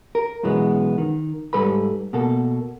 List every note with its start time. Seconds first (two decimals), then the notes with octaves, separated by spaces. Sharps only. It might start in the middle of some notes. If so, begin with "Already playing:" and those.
0.15 A#4
0.43 F#2 B2 E3 G#3 B3
0.98 D#3
1.53 G#2 C#3 G3 A4 B4 B5
2.13 B2 A#3 A4